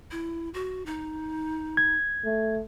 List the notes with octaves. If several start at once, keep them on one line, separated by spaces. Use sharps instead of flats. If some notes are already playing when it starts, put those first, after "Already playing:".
E4
F#4
D#4
G#6
A3